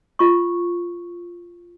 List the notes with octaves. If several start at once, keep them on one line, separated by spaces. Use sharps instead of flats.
F4 C#6